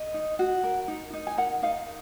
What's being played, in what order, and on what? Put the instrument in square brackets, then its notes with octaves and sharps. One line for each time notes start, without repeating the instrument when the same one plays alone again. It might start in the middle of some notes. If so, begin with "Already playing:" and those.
Already playing: [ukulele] D#5
D#4
F#4
A#4
D#4
D#4
G#5
A#4 F#5
D#4 F5